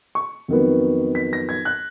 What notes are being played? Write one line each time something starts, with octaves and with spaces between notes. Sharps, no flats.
C#6
F2 D#3 F#3 B3
B6
A#6
G#6
F#6